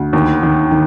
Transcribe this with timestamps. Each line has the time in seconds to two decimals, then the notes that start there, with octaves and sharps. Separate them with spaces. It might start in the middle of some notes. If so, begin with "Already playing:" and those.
Already playing: D2
0.13 D#2
0.43 D#3
0.71 D#3